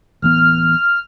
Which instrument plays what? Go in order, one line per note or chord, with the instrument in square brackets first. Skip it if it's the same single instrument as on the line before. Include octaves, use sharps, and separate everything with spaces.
[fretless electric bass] D1 E3 B3 [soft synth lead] F6